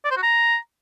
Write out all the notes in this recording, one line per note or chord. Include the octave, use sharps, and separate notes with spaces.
D5
C5
F#4
A#5